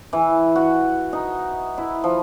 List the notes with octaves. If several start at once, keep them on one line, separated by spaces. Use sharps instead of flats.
E3
F#4
D#4
E4
F3